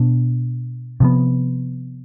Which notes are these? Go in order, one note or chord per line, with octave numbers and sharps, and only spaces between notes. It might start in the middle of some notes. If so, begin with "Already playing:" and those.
Already playing: B2 B3 D4
C3 F3 B3